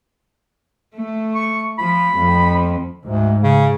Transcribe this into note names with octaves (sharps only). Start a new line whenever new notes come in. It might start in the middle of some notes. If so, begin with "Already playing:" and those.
A3
C#6
F3 B5
F2
D2 G#2
C#3